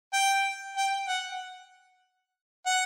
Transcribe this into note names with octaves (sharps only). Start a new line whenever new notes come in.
G5
G5
F#5
F#5